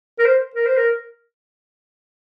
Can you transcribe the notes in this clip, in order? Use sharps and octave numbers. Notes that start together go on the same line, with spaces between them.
A#4
C5
A#4
C5
A#4